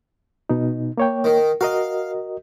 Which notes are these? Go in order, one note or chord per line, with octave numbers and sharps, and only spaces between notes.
B2 D#4
A#3 C#5 G5
D#3
F#4 A#4 D#5 F5